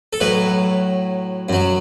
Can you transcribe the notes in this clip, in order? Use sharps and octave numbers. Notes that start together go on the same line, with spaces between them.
A4
A2 F#3 B4
F#2 F#3